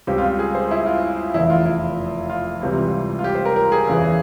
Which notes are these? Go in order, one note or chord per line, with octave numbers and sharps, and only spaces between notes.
C#2 C#3 G3 C4 G4
F4
G#4
C5
E4
F4
F1 E2 C#3 E3 E4
F4
E4
F4
C#2 C3 E3 G3
F4
G4
C5
A#4
A#4
G#4
E2 C#3 E3